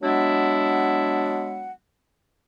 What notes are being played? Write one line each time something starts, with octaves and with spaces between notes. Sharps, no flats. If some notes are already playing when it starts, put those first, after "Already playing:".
F#3 G#3 B3 D4 E4 F#5